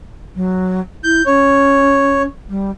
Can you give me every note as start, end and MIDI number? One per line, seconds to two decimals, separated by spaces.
0.36 0.81 54
1.04 1.22 64
1.04 1.23 91
1.26 2.26 61
1.26 2.22 73
2.50 2.71 55